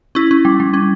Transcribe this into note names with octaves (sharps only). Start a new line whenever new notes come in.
C#4 E4
C#4
G3
G3
C#4